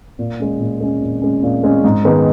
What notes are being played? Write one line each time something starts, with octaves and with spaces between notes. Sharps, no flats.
A#2
G#3 C#4
A#2
G#3 C#4
A#2
G#3 C#4
A#2
G#3 C#4
G#2
D#3 G#3 B3 D#4